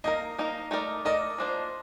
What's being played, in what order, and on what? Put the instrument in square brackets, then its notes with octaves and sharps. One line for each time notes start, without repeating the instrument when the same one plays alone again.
[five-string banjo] A#3 D#4 A#4 [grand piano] D#5
[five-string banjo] A#3 D#4 A#4
A3 D#4 A#4 D5
[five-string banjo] A3 D#4 A#4 D5 [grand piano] D#5
[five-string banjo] F3 A#3 D4 A4 C5